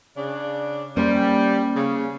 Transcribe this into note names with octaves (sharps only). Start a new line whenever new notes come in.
C#3 D4
G3 A#3 C#4 C5
C#3